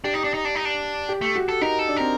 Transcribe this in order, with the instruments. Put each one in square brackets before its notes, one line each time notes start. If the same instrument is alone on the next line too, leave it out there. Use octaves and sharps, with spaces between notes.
[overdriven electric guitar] D4 [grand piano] G4
[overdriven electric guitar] D#4
D4
D#4
D4
D#4
D4
[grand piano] G4
[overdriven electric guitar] A3
[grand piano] F#4
[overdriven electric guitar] A4
[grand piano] D#4 [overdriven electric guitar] A#4
[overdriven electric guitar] A4
[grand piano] D4
[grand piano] C4 [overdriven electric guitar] A#4